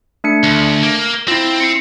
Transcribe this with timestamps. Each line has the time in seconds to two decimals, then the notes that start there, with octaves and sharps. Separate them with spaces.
0.24 A3 D4 C#7
0.43 D2
0.83 A#3
1.28 C4 E4 F4
1.60 C7 C#7